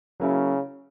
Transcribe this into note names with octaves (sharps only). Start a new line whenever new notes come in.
C#3 F#3 A#3 C#4 E4